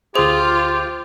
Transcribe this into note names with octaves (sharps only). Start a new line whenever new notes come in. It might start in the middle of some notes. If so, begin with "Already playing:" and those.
D2 F4 G4 G#4 C5